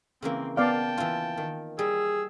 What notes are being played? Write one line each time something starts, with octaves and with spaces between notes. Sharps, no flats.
C#3 E3 A#3 C4
B3 D5 F5 G5 A5
E3 F4
D#3
G3 G#4 E6